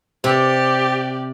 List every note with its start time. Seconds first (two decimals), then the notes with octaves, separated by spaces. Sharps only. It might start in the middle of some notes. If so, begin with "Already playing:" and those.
0.24 C3 G4 D5